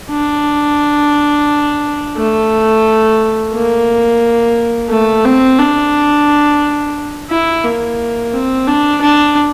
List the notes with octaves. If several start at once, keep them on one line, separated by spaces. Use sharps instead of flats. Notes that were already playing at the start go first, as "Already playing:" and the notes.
D4
A3
A#3
A3
C4
D4
E4
A#3
C4
D4
D4